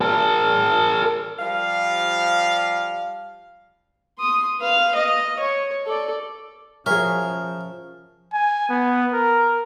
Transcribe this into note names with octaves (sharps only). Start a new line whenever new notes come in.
A#4 A5
F3 G3 F5
C6 D#6
B4 F5
D#5
C#5
A4 D5
F3 C#4 F#4 G#4 A#4 E5
G#5
B3
A#4